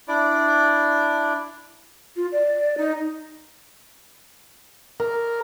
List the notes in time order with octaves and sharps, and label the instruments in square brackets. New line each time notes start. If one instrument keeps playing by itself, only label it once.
[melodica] D4 E4 D5
[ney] F4
D5
D#4
[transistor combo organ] A#4